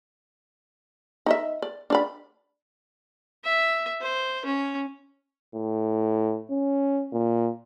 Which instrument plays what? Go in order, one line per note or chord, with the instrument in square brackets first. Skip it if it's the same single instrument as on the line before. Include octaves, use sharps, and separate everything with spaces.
[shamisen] D#4 D#5 E5
D5
D4 D5 B5
[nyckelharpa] E5
C5
C#4
[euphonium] A2
C#4
A#2